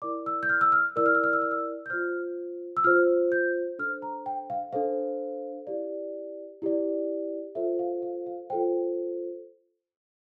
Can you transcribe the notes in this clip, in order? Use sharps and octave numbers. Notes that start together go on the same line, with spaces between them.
E4 A#4 D5 D6
E6
G6
F6
E6
F6
E4 A#4 D5 E6
F6
E6
F6
E6
F6
E6
G6
F4 C5 F6
E6
F4 C5 F6
G6
D4 A4 C5 F6
A#5
G5
F5
D4 A4 C5 F5
E4 G4 D5
E4 G4 D5
F4 A4 C5 E5
F5
F5
F5
F4 A4 C5 G5